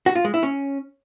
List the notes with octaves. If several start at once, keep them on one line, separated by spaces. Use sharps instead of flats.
F#4
F4
G#3
E4
C#4